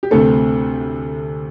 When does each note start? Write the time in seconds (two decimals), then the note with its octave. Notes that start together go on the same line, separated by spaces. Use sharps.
0.03 G4
0.11 D2 C3 A3 C4 A4